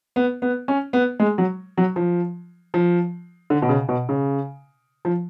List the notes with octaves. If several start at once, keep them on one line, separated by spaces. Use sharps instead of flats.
B3
B3
C#4
B3
G#3
F#3
F#3
F3
F3
D3
B2
C#3
B2
C#3
F3